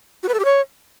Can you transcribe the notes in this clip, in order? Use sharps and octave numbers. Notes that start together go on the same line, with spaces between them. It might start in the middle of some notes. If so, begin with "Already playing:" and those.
F#4
B4
A4
G4
C#5